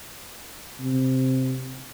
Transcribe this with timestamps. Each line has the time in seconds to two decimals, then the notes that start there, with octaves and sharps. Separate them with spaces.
0.80 C3